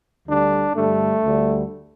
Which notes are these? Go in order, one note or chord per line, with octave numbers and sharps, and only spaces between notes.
D2 D3 G3 D4
G2 D3 G3 A3
D2 D3 G3